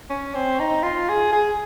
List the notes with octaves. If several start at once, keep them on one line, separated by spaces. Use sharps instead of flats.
C#4
C4
D#4
F4
G#4
G#4